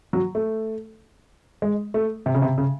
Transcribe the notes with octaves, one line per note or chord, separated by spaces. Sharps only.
F#3
A3
G#3
A3
C3
C#3
C3
C#3